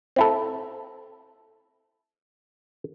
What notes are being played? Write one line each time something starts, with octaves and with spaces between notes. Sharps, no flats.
C4 E4 A4